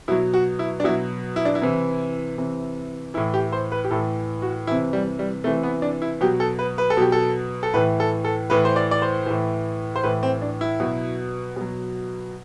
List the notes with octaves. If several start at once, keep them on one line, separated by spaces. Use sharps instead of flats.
B2 F#3 E4
F#4
E4
D4
B2 F#3 E4
E4
D4
E4
C3 E3
C3 E3
A2 E3 E4
G4
C5
B4
G4
A2 E3 A4
F#4
C3 E3 E4
G3
G3
C3 E3 A3
B3
D4
E4
B2 F#3 G4
A4
B4
B4
A4
B2 F#3 G4
A4
A4
A2 E3 B4
A4
A4
A2 E3 B4
C5
D5
D5
C5
A2 E3
C5
A2 E3 B4
C4
D4
E4
B2 F#3
B2 F#3